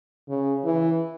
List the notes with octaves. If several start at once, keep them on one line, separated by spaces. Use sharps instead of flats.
C#3
E3